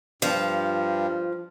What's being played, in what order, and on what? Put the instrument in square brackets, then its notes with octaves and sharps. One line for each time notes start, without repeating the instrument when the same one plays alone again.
[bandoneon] G2 [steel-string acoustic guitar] F3